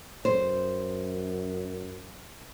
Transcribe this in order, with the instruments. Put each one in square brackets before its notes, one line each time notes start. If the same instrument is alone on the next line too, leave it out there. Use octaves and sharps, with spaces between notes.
[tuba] F#2 [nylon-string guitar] C5